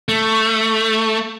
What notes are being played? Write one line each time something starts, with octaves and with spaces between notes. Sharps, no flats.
A3